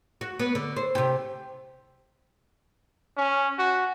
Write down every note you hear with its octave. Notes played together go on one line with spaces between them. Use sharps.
F#4
B3
D3
C5
C3 G4
C#4
F#4